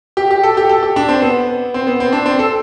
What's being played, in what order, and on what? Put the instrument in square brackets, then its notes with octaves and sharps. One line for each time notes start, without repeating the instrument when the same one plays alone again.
[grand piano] G4
G4
A4
G4
A4
G4
D4
C4
B3
C4
B3
C4
D4
C4
A4